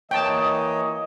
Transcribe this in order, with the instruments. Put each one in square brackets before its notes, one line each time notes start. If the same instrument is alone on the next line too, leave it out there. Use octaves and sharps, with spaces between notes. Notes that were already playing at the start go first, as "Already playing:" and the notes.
[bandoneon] E3 A#3 C#5 [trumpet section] D#5 [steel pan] G5 A5